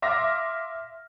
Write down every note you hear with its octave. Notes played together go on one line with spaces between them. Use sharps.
E5 F5 C6 D6 F6 A#6